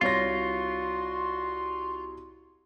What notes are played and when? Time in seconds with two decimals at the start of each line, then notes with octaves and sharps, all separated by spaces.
0.01 C2 F4 F#4 C#5 C6 A#6